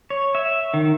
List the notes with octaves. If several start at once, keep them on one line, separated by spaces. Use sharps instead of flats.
C#5
E5
D#3